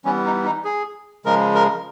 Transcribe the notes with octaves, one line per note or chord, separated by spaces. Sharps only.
E3 G3 B3 C#4
D#4
D#4
G#4
C#3 F3 G#3 A#4
A#4